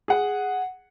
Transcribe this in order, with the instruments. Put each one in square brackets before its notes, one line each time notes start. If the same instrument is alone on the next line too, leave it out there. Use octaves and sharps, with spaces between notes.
[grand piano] G#4 F#5